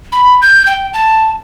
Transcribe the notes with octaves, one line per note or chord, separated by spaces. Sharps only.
B5
G6
G5
A5